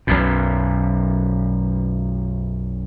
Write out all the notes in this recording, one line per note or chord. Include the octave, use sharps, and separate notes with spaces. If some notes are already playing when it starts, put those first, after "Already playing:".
B1 F#2 B2